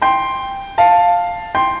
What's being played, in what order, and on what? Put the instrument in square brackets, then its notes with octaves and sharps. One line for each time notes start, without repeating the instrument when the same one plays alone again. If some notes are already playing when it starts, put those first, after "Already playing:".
[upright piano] G5 C6
F5 A5
G5 C6